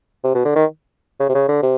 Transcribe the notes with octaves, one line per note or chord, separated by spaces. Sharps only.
C3
B2
D3
D#3
C#3
C3
C#3
D3
C3